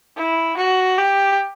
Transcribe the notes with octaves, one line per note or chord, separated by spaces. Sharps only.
E4
F#4
G4